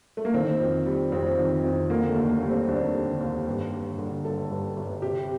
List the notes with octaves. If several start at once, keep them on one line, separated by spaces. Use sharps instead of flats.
A3
A#3
D#3 C4
F2
G3
F2 C4
D#3
F2
D3 A#3
A3
D#2
A#3
G3
C4
D#2 D4
D3
D#2
G2
G1
D3
G1 A4
G2
G1
C3 G4